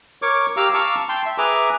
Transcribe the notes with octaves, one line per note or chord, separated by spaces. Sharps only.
A#4 C#5 C#6 D6
G4 F5 A#5 D6 E6
F5 A5 A#5 C#6 D6 E6
G5 A5 C6
E5
G#4 B4 E5 G#5 A#5 D6